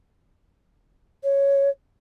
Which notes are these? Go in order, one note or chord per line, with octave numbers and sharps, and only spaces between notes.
C#5